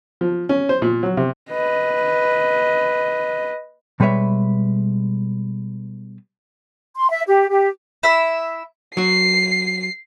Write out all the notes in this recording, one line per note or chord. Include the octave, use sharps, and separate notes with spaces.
F3
C#4
C5
A#2
F#3
C3
B4 D#5
B2 G3 G#3 B4 C#5 E5
C6
E5
G4
G4
E4 E5
F#3 F#4 C7